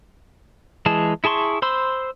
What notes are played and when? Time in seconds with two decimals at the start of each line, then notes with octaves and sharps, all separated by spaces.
0.86 E3 G#3 G#4 A5
1.24 E4 G#4 A5 C6 C#6
1.62 C5 B5 C6 E6